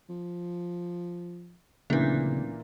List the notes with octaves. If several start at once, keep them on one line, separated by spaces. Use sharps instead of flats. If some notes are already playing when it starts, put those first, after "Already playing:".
F3
D1 A#2 C#3 E3 A#3 C#4 D4